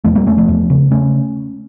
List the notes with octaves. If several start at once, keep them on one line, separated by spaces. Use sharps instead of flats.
E2 F3 A3
G3 A#3
E2 A3 C#4
F3 A3
E2
C#3
C#3 A3 C#4